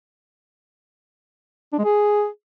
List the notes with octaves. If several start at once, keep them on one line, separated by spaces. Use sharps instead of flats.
D4
G#3
G#4